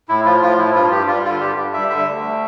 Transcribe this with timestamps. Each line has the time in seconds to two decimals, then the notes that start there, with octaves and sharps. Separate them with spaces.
0.09 A2 E4
0.25 F3 F4
0.42 A2 F4
0.58 F3 E4
0.74 G2 F4
0.91 G2 G4
1.07 G3 F4
1.24 D3 F4
1.40 G2 G4
1.57 G2
1.73 G3 E5
1.90 D3 E5
2.07 D2
2.23 G3